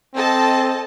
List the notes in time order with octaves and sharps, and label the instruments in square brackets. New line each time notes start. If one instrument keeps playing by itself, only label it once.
[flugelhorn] C4 [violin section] A4 D#5 A5